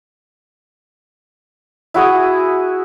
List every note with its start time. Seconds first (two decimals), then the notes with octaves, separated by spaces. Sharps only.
1.94 E4 F#4 G#4 D#6